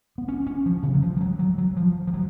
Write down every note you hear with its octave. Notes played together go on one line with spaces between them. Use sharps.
B3
C#4
C#4
F3
C#3
F#3
F3
F3
F#3
F#3
F#3
F3
F3
F#3